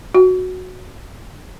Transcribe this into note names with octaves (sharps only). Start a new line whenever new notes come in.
F#4